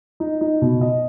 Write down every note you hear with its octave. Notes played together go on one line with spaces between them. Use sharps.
D#4
D#4
B2
D#5